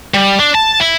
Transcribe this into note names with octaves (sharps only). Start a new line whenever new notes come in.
G3
D4
A5
E4